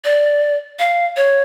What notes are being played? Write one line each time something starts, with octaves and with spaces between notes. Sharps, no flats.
D5
F5
C#5